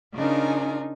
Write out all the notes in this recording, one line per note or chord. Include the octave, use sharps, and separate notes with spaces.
C#3 D4 D#4 F4 A#4 G#5